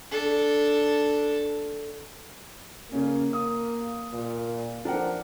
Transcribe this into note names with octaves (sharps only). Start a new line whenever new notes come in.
D4 A4
C#3 A#3 C#4
D#6
A#2
F3 D4 A#4 F#5